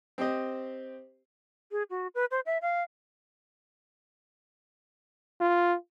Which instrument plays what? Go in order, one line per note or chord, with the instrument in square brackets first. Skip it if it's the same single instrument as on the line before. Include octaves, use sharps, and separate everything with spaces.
[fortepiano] C4 G4 C5 D#5
[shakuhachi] G#4
F#4
B4
C5
E5
F5
[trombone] F4